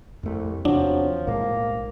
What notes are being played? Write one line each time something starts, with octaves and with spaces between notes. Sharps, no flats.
C2 F2 A3
E2 C3 F3 F#3 D4
B1 A2 G#3 A#3